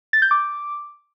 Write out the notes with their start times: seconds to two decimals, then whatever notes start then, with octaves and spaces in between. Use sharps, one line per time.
0.13 A6
0.22 G6
0.31 D6